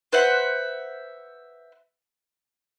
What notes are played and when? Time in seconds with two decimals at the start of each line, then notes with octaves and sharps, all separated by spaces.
0.13 B4 C5 E5 F#5